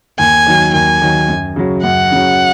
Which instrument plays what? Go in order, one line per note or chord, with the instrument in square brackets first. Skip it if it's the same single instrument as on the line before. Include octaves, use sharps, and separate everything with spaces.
[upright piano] D#2 [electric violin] G#5
[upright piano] D#3 F#3
[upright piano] D#2 [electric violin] G#5
[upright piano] D#3 F#3
F#2
C#3 F#3
[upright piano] F#2 [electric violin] F#5
[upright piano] C#3 F#3